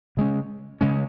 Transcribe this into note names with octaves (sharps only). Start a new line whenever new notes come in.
C#3 G#3 C#4
C#3 G#3 C#4